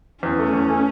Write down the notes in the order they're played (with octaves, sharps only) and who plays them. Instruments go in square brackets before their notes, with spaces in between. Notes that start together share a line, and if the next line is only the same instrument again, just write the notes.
[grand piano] E2 [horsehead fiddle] C#4
[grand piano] A3
E2
A3